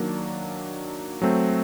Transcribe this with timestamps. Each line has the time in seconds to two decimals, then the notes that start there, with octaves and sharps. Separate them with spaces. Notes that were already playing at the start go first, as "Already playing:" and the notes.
Already playing: D#3 F#3 A#3 D4
1.22 F#3 A3 C4